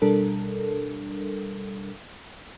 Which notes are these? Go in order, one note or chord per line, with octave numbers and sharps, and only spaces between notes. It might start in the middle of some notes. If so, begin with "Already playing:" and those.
B2 G3 D4 A4 A#4